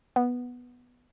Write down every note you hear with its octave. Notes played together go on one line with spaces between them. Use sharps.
B3